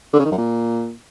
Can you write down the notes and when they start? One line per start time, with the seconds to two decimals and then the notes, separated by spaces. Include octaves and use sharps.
0.13 D3
0.19 C#3
0.25 D#3
0.32 F#2
0.38 A#2